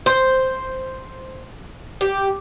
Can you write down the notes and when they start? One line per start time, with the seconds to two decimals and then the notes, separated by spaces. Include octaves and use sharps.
0.06 C5
2.01 G4